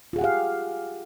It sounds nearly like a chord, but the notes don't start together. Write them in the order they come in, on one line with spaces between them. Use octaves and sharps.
F4 G#4 F#5 G4 F5